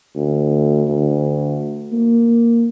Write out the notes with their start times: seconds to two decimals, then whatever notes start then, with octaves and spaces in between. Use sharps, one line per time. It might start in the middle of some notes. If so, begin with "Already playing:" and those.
0.15 D2
0.88 D2
1.93 A#3